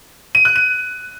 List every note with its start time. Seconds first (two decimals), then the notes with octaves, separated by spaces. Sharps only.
0.35 D#7
0.45 F#6
0.56 D#7